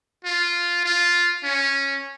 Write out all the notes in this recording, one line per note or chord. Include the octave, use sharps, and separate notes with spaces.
F4
F4
C#4